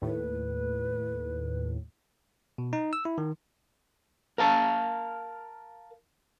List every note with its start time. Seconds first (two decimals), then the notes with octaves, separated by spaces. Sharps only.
0.02 D#2 A2 B4
2.58 B2
2.73 D#4
2.93 E6
3.05 E4
3.18 D#3
4.38 A#4 F5 A5